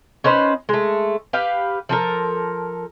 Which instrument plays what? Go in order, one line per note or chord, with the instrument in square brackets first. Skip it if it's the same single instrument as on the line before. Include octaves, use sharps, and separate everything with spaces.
[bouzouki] C#4 D#4 B4 C5
G#3 A3
G4 B4 F5
F3 A4 A#4